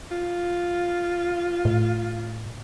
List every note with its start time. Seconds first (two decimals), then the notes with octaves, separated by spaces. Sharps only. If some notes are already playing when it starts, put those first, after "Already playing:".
0.11 F4
1.65 A2